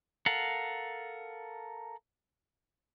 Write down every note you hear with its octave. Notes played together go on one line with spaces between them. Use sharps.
A4 A#4 F5 F#5